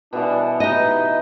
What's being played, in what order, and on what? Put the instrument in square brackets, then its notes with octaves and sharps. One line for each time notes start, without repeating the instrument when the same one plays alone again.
[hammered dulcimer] B2 E3 F#5 [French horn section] F#3 G3 D4
[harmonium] D#4 [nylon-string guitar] G4 D#5 [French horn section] B4